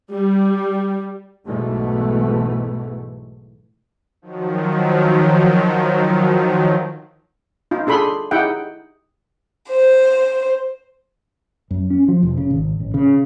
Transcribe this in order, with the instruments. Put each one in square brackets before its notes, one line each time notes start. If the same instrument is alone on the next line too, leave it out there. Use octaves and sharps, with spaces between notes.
[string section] G3
[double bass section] B1 G#2 B2 E3 G#3 A3
[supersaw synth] D#3 F3 F#3
[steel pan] D#4 F4
D4 G#4 A4 B5 C6
D#4 E4 G4 G#4 F#5 G5
[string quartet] C5
[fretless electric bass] F#2
C#4
F3
F1
C#3
G#1
A1
C#3